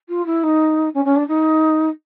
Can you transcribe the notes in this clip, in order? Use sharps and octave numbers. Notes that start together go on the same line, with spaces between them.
F4
E4
D#4
C#4
C#4
D4
D#4